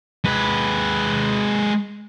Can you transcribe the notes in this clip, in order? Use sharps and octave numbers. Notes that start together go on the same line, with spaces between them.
G#3 B4